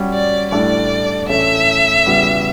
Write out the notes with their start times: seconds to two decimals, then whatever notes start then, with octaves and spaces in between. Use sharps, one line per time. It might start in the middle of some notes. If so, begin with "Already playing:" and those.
Already playing: G3 C#4 F#4 C#5
0.14 D5
0.51 A2 G3 D4 A4 D5
1.29 A2 E3 A3 C#4 E5
2.06 E2 C#3 G3 B3 F#4